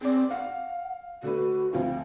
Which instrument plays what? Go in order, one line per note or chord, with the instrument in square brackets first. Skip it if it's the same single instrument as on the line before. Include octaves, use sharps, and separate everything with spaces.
[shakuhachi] C4 [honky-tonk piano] G#4 D5
[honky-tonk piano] F5 [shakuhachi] F#5
[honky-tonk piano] D3 A3 B4 [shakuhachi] F#4
[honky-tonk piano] D2 F3 C4 [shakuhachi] F5